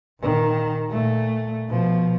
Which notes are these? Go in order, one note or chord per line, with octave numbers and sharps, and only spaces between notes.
A#2 D#3
A#2 A3
B2 F3